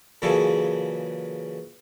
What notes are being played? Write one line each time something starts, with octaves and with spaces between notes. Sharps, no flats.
A#2 C#3 E3 F#3 G#4 A4